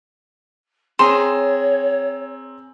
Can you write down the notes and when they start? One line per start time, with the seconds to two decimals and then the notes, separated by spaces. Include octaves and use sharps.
0.99 C4 G#4 C#5 A#5 C6 E7